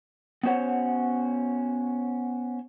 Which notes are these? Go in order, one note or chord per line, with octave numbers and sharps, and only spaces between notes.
B3 C#4 F#4 C5 C#5 F#5